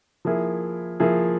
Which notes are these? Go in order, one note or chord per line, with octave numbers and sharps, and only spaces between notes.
F3 A#3 E4 G#4
F3 A#3 E4 G#4